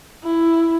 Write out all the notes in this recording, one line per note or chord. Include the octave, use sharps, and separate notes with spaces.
E4